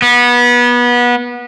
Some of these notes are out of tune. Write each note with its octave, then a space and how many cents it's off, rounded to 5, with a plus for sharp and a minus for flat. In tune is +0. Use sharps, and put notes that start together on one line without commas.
B3 -25